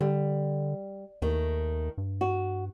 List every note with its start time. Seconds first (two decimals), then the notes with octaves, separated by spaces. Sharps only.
0.01 D3 G3
1.22 D#2 D#3 A3
1.98 G2
2.21 F#4